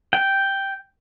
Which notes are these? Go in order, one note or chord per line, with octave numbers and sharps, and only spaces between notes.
G5